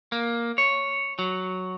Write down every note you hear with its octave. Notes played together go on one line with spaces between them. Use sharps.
A#3
C#5
F#3